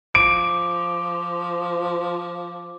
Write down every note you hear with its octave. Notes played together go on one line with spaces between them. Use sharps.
F3 D6 D7